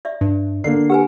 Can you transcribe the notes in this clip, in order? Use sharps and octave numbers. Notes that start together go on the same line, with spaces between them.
D5 E5
G2
D3 A#3 C7
G4 B4 F#5 G#5